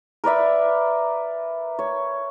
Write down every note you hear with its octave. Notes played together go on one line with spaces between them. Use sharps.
A#4 B4 D5 E5
C#5